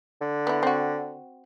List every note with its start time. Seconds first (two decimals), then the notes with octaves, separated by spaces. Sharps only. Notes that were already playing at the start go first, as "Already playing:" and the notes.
0.21 D3
0.47 B3 E4
0.63 C4 F#4